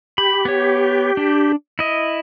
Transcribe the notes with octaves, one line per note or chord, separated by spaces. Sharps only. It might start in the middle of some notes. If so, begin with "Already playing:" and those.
G4 B5
B3 C#5
D4
E4 D#5